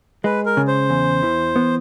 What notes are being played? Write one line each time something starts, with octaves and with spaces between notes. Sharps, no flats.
G#3 B4
A#4
C#3
C5
E2
E3
B3